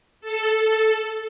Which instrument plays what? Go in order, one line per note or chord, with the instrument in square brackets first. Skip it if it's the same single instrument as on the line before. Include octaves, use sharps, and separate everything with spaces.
[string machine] A4